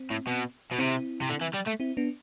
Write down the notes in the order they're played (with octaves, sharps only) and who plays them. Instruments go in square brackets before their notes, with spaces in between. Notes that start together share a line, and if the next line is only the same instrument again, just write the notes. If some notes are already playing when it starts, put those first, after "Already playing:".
Already playing: [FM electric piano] C4
[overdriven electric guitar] A2
B2
B2
[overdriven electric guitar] C3 [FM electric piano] C4 E4
[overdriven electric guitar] C3
D3
E3
G3
A3
[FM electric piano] C4 E4
B3 D4